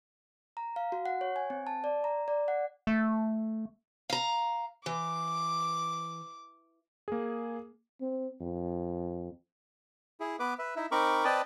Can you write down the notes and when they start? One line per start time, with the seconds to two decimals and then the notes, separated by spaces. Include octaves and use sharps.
0.57 A#5
0.76 F5
0.92 F#4
1.06 F#5
1.21 C#5
1.36 G#5
1.50 C4
1.67 A5
1.84 D5
2.04 A#5
2.28 D5
2.48 F#5
2.87 A3
4.10 F5 A#5
4.86 E3 D6
7.08 A#3 G#4
8.01 C4
8.40 F2
10.20 E4 G#4
10.40 B3 B4 D6
10.59 B4 E5
10.76 D#4 E4 E5
10.92 C4 D#4 A#4 B5 C#6 D6
11.25 C4 B4 D5 D#5 G5 A5